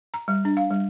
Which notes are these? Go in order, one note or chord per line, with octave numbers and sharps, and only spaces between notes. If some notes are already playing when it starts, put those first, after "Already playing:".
A#5
G3
D4
F5
G3